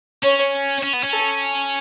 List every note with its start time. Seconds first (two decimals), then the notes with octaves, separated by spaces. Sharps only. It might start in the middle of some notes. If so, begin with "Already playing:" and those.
0.24 C#4 C#5
0.83 C#4
0.94 B3
1.04 C#4
1.13 A4